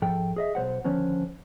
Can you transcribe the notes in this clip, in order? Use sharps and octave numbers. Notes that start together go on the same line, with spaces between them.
G#2 F3 A4 G5
G#4 D#5 E5
B1 E3 C5 F#5
D3 D#3 F3 C#4 C5